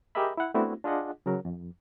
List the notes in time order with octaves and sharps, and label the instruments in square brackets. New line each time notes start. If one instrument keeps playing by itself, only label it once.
[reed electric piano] G4 G#4 A#4 D#5 E5 B5
E4 F#5
A3 B3 C4 D4 E4 F#4
D4 F4 G#4 D#5 F#5
C#3 F#3 A#4
F2